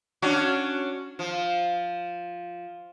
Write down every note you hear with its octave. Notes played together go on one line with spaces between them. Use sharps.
C#4 D4 F#4
F3